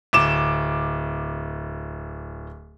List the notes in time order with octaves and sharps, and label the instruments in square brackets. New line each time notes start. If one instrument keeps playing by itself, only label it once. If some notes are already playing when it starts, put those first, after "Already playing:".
[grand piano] D1 D6 E7